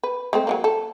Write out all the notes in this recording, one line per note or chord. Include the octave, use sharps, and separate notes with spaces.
B4
G#3 A3 C4
F#3 G#3 A#3
A4